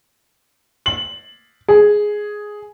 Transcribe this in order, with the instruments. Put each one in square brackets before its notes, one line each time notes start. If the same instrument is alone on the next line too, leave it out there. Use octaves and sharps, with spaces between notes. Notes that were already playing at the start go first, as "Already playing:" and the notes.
[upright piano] F#7
G#4